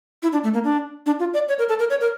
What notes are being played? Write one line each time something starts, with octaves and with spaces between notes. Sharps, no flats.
E4
D4
A3
A#3
D4
D4
F4
D5
C#5
A#4
A4
A#4
C#5
A#4